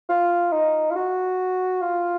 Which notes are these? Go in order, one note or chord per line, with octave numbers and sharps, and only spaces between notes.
F4
D#4
F4
F#4
F4